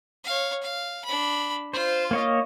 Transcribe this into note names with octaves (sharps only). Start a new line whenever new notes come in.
C#5 F5
F5
D4 B5
F4 C5
A#3 C#5 D#5